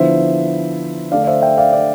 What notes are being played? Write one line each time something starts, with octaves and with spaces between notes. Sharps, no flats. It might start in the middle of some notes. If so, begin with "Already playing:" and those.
Already playing: D3 F3 B3 E4 C5 E5
D3 A3 D4 D5 F5
D5
C5 E5
E5 G5
D5 F5
D5 F5